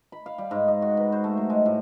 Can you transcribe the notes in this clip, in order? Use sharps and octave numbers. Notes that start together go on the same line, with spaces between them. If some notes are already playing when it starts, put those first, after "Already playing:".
B5
F5
G3
G#2
D#5
F#4
B4
C5
A3
F#3
G#3
A2